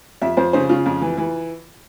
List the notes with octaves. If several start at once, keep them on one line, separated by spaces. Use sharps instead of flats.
F2 E5
F2 C5
C#3 C5
C#3 F4
F2
E3
E3